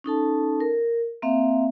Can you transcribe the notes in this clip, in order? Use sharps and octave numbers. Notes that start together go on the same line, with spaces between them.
C#4 D#4 A4 A5
A#4
A#3 C4 E5 F5